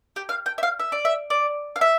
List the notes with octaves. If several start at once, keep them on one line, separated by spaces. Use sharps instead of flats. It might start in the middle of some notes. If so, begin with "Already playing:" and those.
G4
F5
G5
E5
F5
E5
D5
E5
D5
F5
E5